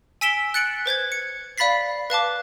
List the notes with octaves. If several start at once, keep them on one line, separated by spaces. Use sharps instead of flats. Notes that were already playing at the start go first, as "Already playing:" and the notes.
G#5 E6 B6 D7 E7 G7
F#6 A6 C#7 D7 F#7
B4 C5 G6 G#6
C#7
D5 F5 B5 A6 B6 C7
B4 F5 A5 D6